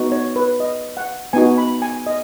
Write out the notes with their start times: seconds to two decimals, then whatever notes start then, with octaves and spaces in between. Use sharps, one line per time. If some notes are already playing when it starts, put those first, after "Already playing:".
Already playing: B3 D#4 F#4
0.12 C#5
0.36 B4
0.60 D#5
0.97 F#5
1.33 B3 D#4 F#4 G#5
1.58 B5
1.82 G#5
2.06 D#5